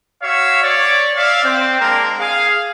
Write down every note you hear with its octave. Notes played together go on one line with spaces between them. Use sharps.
F#4 C#5 E5 F5
C#5 D5
D5 E5 F5
C4
G#3 A#3 D4 A#4
G#4 F5